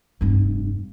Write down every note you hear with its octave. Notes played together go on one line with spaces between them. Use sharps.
F1 G2